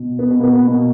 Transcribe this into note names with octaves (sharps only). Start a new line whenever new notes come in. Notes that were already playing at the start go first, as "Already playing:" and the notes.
Already playing: B2
B3
B2
A#3
B3
B2 A#3